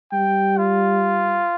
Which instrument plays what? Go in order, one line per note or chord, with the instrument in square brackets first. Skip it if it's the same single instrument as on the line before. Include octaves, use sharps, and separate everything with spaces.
[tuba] G3 [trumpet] G5
[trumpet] F4